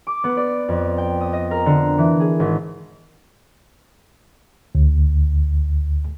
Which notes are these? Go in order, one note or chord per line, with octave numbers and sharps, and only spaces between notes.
D6
B3
D5
F2
G5
D#6
D#5
A#4
D3
E3
G#4
G#1
D2